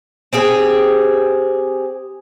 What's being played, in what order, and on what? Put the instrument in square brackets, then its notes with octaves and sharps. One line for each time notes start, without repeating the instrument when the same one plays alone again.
[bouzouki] C4 G4 G#4